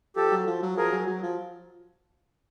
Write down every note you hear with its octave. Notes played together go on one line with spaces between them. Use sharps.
F3 G4 A4
F#3
F3
F#3
F3 G#4 A#4
F#3
F#3
F3